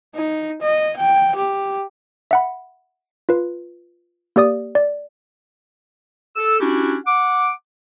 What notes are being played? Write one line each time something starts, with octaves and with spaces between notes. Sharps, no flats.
D#4
D#5
G5
G4
E5 F#5 B5
F4 B4
A#3 G4 D5 D#6
D5
A4 E6
C#4 D4 E4 F#4 G4
F#5 D6